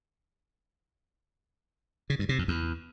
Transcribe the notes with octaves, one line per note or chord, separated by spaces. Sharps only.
C#3
G2
C3
F2
E2